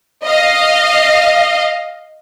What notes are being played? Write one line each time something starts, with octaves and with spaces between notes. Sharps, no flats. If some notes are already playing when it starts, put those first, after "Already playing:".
D#5 F5